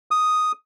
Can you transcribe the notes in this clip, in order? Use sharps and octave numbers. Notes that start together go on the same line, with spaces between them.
D#6